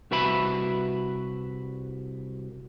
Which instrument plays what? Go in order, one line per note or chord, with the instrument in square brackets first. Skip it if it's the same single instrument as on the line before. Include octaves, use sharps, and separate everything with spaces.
[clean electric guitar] C2 F#4 B4 E5 B5